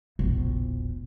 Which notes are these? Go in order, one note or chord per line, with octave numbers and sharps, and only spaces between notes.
E1 A#1